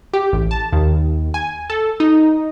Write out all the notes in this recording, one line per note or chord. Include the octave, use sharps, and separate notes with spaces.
G4
A1
A5
D#2
G#5
A4
D#4